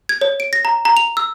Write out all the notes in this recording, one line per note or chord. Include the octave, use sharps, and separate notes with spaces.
G#6
C#5
D7
A#6
A#5
A#5
F7
E6